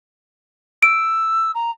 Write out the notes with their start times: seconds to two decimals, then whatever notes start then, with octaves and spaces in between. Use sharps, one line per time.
0.83 E6 D7
1.55 A#5